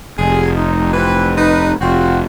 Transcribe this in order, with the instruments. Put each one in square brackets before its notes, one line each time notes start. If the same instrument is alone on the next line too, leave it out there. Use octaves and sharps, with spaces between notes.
[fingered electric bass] F1 [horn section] G#4
[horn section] D#4
E3 C4 B4
D#4 B4
[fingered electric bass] F1 [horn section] C4 F4 F#4